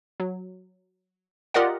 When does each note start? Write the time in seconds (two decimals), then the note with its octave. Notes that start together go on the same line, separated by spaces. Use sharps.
0.20 F#3
1.54 F4 G4 A#4 D5 D#5 F#5